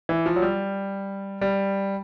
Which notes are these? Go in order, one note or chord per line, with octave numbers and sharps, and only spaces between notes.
E3
F3
F#3
G3
G3